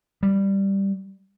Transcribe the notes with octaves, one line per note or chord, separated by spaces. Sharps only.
G3